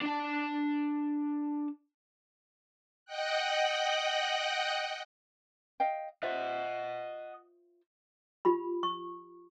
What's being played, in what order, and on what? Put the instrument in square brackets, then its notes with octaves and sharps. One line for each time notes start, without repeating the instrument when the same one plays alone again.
[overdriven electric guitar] D4 A5
[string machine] D#5 F#5 G5 F#6
[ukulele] D#5 F5 G5
[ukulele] F4 C5 E5 [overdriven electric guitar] D#5 F#5
[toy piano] F4 G4 B5
C#6